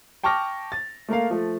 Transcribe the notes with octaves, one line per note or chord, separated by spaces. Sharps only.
G5 A5 C#6 D6 F6 A#6
A6
A3 A#3 A#4 F5
F3 A3